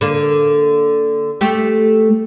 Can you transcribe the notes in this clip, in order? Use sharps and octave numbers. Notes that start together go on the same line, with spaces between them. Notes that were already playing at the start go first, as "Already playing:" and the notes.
D3 A#3
A3 G4